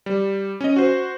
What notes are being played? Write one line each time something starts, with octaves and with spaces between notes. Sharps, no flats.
G3
C#4 D#5
F#4 C5